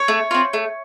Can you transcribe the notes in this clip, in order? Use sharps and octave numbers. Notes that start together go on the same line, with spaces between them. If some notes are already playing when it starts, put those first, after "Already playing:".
Already playing: C#5
A3
C4 F4
A3